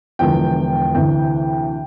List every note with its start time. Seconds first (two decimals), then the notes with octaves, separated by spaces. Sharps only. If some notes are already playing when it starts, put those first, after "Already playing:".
0.19 E1 E2 D3 F3 G5
0.95 D2 C3 E3 G5